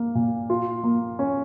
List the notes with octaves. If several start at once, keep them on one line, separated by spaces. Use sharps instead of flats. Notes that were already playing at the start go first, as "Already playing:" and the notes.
Already playing: A#3
A#2
F4
A#3
C#4